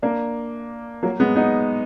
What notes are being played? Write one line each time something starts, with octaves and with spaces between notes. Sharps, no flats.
A#3 D4
F#3 A#3
G#3 B3
B3 D#4